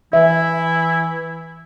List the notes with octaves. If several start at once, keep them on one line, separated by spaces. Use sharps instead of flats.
E3 E4 E5